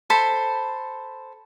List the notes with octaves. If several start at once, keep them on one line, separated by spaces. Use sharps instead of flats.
A4 C5 B5